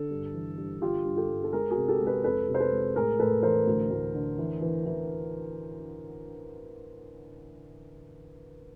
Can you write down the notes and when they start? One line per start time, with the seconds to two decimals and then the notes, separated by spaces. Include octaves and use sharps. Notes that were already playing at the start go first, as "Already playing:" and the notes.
Already playing: D3 A4
0.11 G2
0.34 E3
0.57 G2
0.82 D3 F4 G4
1.05 G2
1.17 G4 A4
1.29 G2
1.44 A4
1.53 G#3 G#4 A#4
1.71 F#4 G#4
1.77 C3
1.88 G4 A4
2.00 G#3
2.07 A4 B4
2.24 F2 A4 B4
2.49 C3
2.54 C5
2.60 A4 B4
2.71 G#3
2.96 A2 G#4 A#4
3.19 A2 A4 B4
3.42 E3 A#4 C5
3.67 D2
3.90 D2
4.14 D3
4.38 E3
4.61 E3
4.86 E3